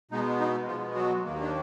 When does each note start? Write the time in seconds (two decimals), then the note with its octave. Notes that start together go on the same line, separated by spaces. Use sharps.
0.11 B2 G#3 B3 D#4
0.40 D#4
0.67 B2 F3 G#3 B3 F4
0.96 F#3 F#4
1.24 D#2 D#3 A#3
1.41 D4